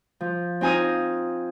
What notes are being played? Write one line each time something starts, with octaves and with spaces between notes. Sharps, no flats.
F3
C4 D#4 F4 G#5 A#5 D#6